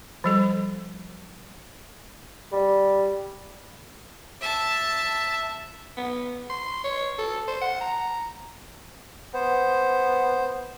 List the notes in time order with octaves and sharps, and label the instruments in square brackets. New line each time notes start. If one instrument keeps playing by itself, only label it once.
[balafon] F3 G3 A4
[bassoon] G3
[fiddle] E5 A5
[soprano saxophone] B3
C6
C#5
A4
C5
F#5
A#5
[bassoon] B3 [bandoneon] C5